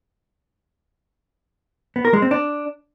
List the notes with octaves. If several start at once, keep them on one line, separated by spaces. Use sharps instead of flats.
B3
A#4
G#3
C4
D4